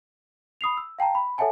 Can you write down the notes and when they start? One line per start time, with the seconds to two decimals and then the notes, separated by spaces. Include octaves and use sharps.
0.61 B5 D#6 C7 F7
0.77 E6
0.99 F5 G5 A5 A#5
1.15 B5
1.38 A4 C#5 E5 F#5 G#5 A5